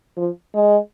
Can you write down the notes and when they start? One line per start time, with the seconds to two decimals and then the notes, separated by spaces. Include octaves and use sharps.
0.17 F3
0.55 G#3